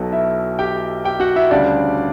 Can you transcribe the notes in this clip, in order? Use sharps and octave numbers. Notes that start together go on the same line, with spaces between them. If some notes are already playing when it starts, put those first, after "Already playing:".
Already playing: B1 B2 F#3 A4
E4 E5
G4 G5
G4 G5
F#4 F#5
E4 E5
D2 C#3 G3 D4 D5